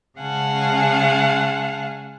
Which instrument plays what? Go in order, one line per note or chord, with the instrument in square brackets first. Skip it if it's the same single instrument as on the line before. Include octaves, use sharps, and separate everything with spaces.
[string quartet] C#3 G#3 F5 F#5 G#5 A5